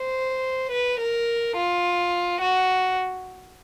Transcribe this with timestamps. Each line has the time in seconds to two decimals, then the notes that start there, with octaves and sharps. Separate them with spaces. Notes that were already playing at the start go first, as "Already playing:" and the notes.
Already playing: C5
0.72 B4
1.00 A#4
1.57 F4
2.42 F#4